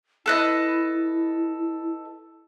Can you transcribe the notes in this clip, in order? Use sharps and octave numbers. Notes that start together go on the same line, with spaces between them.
E4 A4 B4 D#5